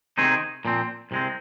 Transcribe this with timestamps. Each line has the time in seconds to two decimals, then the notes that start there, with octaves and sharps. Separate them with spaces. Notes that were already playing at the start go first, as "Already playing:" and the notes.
0.18 C3 D#3 C4 D#4 G#4
0.65 A#2 F3 C4
1.11 C2 C3 G#3 C4